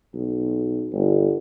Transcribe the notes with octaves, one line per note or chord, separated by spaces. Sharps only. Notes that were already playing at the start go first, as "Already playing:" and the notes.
B1
G1